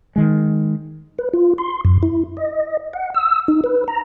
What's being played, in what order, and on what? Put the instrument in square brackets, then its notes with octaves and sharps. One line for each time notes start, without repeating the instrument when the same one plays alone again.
[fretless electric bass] D#3 G#3
[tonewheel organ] B4
F4
C6
F#2
E4
D#5
F#5
E6
D#4
B4
A#5